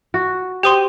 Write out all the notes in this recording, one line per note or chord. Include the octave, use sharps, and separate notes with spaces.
F#4
G4 C5 G5 C6 D#6